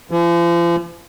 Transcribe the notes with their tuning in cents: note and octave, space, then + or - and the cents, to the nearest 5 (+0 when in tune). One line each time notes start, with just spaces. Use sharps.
F3 -40